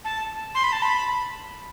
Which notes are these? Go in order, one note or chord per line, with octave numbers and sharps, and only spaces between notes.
A5
C6
B5
A5
B5